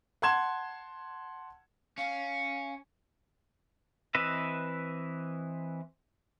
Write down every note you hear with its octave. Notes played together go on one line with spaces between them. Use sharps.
F#5 A5 C6 G#6 E7
C#4 F5
E3 C4 B4 D#5 E5